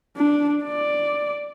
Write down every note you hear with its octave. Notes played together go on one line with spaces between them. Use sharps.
D4
D5